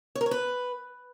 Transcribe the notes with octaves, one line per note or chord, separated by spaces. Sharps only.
C#5
A#4
C#5
B4